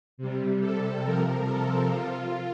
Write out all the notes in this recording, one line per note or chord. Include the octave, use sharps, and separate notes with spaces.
C3 G3
A4
C3 F3 A#4
A4
F4